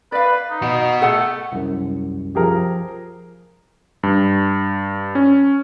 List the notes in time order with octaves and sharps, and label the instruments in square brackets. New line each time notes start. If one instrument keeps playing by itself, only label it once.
[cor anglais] B4 [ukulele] D5 F5
[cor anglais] D#4
[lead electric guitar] B2 F#4
[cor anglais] A3 [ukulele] G#4 F#5
[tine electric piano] C2 F#2
[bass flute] F3 [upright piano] G4 G#4 A#4
[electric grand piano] G2
C#4